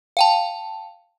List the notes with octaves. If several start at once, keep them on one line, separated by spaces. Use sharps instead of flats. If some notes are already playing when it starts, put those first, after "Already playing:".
F5 G5 A5